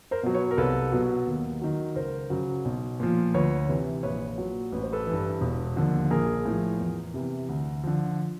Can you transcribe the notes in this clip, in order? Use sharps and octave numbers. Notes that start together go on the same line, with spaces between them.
A#4 C5
B2 F#3
B4 C#5
A#4
C2 A4 B4
B2 F#3
D#2
D#3 F#3
C#2 A#4 C5
C#3 F#3
B1
A#2 F3
D2 B4 C#5
C3 E3
A#1 B4 C#5
A#2 F#3
A1 B4
C5
A4 B4
E3
G2
E1
D#2 D3 F3
A#1 G#4 A#4
A2 F3
E2
C3 E3
D2
D3 F3